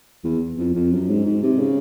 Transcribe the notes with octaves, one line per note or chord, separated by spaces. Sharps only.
E2
F2
F2
F#2
G#2
G#2
C3
C#3